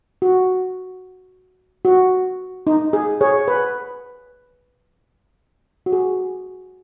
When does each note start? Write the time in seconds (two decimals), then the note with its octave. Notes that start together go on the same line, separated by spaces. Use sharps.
0.22 F#4
1.85 F#4
2.67 D#4
2.93 G#4
3.21 G#4 C#5
3.48 B4
5.86 F#4
5.92 G#4